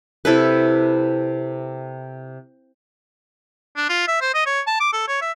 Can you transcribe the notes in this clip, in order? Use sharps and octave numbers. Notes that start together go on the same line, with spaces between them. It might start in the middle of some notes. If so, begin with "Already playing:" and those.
C3 E4 A4 B4
D4
F4
E5
C5
D#5
C#5
A5
D6
A4
C#5
E5